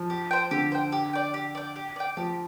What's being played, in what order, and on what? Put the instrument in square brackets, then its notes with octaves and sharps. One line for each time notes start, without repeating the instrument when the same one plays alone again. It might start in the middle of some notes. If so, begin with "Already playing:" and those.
Already playing: [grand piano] F3
[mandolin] G4
C5 G5
[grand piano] D3 [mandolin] G4
[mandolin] C5 G5
G4
D5 G5
G4
D5 G5
G4
D5 G5
[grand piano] F3 [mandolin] G4